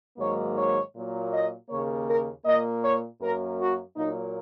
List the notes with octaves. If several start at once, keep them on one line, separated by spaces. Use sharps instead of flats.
G#2 D#3 F#3 A#3 C#5
C#5
A#2 F#3 A#3
D#5
D#2 C#3 A#3 C#5
A#4
A#2 A#3 D#5
C#5
F#2 F#3 A#3 A#4
F#4
A#2 F#3 A#3 D#4